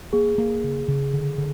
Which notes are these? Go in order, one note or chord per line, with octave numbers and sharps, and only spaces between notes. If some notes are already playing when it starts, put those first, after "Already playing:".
A#3 G#4
A#3
C#3
C#3
D3
D3